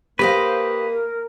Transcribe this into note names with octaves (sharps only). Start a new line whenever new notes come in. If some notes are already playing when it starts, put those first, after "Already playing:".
A#3 G4 B4 C5 D#5 F5
A#4